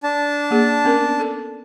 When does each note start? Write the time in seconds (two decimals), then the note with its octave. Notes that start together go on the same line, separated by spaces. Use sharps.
0.03 D4 A5
0.51 A#3 G#4
0.85 B3 C#4 A#4
1.20 A4